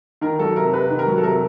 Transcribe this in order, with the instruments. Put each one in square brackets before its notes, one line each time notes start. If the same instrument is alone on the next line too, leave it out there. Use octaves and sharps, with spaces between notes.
[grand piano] D#3 A#4
F#3 A4
C3 A#4
C3 B4
D#3
A#4
F#3
A4
C3 A#4